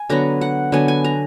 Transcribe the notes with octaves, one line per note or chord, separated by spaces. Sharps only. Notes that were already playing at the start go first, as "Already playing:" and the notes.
Already playing: G#5
D3 F#3 B3 A#5
F#5
D3 F#3 B3 G#5
G#5
A#5